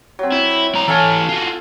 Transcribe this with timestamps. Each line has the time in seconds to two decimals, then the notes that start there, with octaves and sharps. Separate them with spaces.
0.19 F#3 C4
0.32 E4
0.75 E4 A#5
0.88 E3 A4 C#5 F5 G#5
1.29 F4 F#4